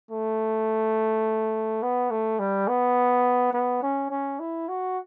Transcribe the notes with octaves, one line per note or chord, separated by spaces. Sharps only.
A3
B3
A3
G3
B3
B3
C#4
C#4
E4
F#4